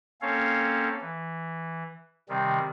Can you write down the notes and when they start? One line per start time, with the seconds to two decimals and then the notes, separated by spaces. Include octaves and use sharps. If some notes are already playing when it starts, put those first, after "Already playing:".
0.22 A#3 C4 C#4 A4 C#5 F5
1.01 E3
2.29 C3 D#3 G3 C4